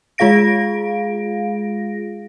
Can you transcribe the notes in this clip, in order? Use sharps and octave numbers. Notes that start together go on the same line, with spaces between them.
G#3 F4 G#4 F5 A#6 D7